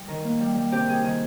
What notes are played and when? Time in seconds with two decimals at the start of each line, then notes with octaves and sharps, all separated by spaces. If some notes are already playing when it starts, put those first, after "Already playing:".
Already playing: G3
0.08 D#3 A#4
0.24 A#3
0.40 G3
0.57 G3
0.72 C3 G4
0.88 D#3 G#4
1.04 D#3 G#4